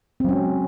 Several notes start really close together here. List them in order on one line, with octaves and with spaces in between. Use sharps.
C4 F#3 C#4 G#3